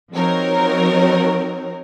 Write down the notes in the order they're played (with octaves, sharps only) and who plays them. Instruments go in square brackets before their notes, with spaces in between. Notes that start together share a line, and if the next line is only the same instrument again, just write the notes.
[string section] F3 C4 D#4 F#4 A#4 C#5